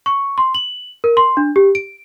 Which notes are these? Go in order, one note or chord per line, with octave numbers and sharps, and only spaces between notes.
C#6
C6
F#7
A#4
C6
D4
G4
D7